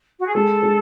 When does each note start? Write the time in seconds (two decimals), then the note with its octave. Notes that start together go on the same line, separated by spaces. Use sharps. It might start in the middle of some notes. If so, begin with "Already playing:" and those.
0.19 F#4
0.27 G#4
0.35 G#3 A4
0.63 G#3